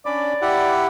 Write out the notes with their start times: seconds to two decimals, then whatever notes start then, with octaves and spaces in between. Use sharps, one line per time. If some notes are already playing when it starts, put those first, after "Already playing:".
0.06 C#4 D4 D5 B5
0.42 E4 G4 F#5